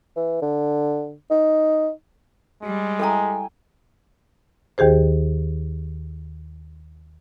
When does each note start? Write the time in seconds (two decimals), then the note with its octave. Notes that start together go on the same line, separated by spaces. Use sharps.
0.16 E3
0.42 D3
1.31 D#4
2.63 G3 G#3
2.99 E4 A4 G5 G#5 A#5
4.78 D#2 D#3 G4 G#4 C5